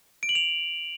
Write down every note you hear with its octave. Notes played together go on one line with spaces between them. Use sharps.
D7
F#7
F7